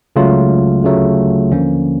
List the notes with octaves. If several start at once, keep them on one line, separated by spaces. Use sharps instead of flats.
C#2 C#3 F#3 A3 F4
D2 C#3 F#3 A3
D#2 D3 F3 A#3 C#4